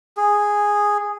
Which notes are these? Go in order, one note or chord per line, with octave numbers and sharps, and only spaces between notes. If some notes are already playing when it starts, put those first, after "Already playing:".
G#4